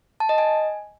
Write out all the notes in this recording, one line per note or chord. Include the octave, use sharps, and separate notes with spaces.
A5
D#5
G#5